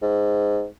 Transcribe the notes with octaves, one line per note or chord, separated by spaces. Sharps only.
G#2